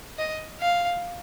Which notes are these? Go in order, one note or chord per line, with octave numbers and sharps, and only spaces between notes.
D#5
F5